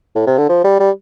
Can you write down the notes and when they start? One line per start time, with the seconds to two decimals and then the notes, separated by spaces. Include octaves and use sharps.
0.16 A2
0.27 C3
0.38 D3
0.49 F3
0.64 G3
0.80 G3